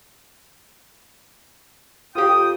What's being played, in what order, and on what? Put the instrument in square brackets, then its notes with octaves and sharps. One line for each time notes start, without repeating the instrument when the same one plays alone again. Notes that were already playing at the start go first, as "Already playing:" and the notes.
[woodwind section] F2 G5 D#6 [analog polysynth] F4 G4